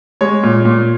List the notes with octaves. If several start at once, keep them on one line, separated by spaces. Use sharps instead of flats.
G#3 C#5
A#2
A#2